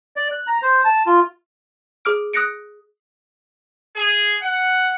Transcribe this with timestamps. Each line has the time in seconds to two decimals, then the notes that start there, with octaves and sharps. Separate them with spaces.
0.16 D5
0.32 F#6
0.47 A#5
0.62 C5
0.84 A5
1.06 F4
2.05 G#4 D6 F6 D7
2.33 D#6 F#6 A#6 C#7 D7
3.96 G#4
4.42 F#5